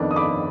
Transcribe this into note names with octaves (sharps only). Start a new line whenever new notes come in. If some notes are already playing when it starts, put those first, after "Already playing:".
Already playing: F2 D#3 B3 D4
D#6
B5 D6